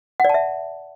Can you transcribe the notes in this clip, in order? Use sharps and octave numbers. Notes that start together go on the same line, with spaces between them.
D5 E5 F#5 A5